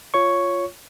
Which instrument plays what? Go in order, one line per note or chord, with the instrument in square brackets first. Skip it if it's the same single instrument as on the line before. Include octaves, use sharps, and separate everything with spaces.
[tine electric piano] F4 C#5 C#6